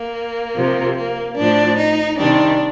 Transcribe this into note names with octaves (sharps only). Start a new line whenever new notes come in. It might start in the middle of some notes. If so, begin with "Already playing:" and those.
Already playing: A#3
C3 F3
A#3
A2 F3 D4
D#4
C3 D#3 G3 D4